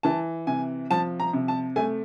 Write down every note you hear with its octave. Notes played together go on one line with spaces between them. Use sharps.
E3 A5
C3 G#5
F3 A5
A#5
C3
A5
A3 G#5